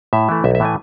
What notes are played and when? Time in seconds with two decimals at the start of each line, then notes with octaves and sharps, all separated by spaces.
0.13 A2 E5
0.29 E3 A3
0.44 B1 E5
0.55 E5
0.60 A2 E3 A3 G#5